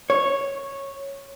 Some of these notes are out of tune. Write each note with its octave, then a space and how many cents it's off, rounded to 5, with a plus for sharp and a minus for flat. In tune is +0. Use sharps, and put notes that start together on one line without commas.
C#5 -5